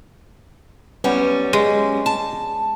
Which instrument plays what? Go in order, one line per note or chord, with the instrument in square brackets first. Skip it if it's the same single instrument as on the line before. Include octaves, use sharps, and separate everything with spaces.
[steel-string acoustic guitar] F#2 G3 C#4 [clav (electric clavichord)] B3
[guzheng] G#3
[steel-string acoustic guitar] A5